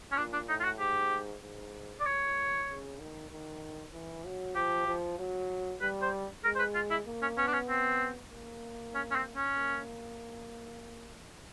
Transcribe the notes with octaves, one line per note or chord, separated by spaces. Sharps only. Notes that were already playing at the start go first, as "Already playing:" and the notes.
C#4
A#2 D4
D4
A2 D#4
F4
F#4
G#2 G4
G#2
D5
A2 C#5
C#3
D#3
D#3
E3
F#3
F3 G4
F3
F#3
G3 B4
C5
G#3 A#4
C5
B4
F4
E4
A#3
C#4
B3 C#4
D4
C#4
C4
A#3
C#4
C#4
C4
C#4
A#3